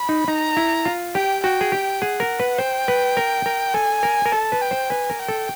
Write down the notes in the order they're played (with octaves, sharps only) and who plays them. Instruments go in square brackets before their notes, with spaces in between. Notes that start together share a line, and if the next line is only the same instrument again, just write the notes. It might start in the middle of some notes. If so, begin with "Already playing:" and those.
Already playing: [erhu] B5
[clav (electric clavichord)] D#4
[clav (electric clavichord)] D#4 [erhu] A#5
[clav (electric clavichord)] E4
F4
[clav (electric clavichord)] G4 [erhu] G5
[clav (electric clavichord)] F#4 [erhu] G5
[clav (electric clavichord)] G#4
G4
[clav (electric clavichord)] G#4 [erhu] F#5
[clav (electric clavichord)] A#4
B4
[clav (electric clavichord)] C5 [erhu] G5
[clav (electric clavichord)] B4
A#4
A#4
[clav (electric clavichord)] A4 [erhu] G#5
[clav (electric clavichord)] A#4
A#4
[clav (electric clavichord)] A4 [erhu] A5
[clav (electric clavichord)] B4
[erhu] G5
[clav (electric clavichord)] C5
[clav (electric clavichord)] B4 [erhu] G#5
[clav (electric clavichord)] A#4
[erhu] G5
[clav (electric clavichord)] A4